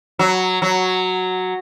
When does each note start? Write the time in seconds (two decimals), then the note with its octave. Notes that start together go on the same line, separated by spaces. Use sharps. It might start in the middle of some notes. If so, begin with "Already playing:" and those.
0.19 F#3
0.62 F#3